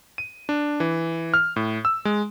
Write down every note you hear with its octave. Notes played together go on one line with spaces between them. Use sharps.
D#7
D4
E3
F6
A2
E6
G#3